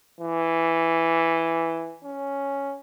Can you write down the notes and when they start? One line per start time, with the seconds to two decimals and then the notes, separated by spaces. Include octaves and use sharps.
0.21 E3
2.04 C#4